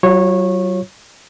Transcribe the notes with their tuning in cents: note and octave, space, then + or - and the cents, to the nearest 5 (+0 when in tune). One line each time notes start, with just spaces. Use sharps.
F#3 +35 F4 +0 C#5 -20